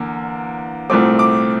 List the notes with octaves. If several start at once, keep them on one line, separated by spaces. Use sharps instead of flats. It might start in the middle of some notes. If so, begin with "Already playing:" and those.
Already playing: E2 D3 A#3
C2 A#2 A3 C4 D6
D6